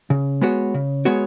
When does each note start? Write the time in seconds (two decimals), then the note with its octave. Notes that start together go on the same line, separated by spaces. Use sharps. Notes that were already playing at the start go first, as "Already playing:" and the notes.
0.10 C#3
0.41 G#3 B3 F#4 C#5
0.74 C#3
1.05 G#3 B3 F#4 C#5